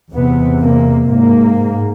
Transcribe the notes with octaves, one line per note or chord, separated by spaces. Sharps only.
E2 C3 B3
A#3
G#2 A#3